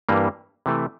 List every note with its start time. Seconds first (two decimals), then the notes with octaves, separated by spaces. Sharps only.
0.09 G2 E3 G3 A#3
0.66 C3 E3 A3